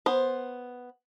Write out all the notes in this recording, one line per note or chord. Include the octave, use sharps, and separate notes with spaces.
B3 C5